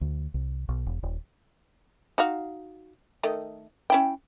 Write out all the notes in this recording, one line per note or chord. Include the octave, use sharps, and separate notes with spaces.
D2
C2
B1
E1
D#1
D#4 F#4 F5
D#3 A3 D#5
C#4 E4 G5